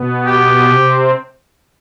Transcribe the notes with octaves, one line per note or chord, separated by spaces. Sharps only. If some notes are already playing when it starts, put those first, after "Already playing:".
Already playing: B2 B3
G4
C3 C4